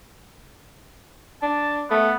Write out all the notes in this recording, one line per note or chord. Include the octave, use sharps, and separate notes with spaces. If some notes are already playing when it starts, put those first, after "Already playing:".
D4 A5
A3 B3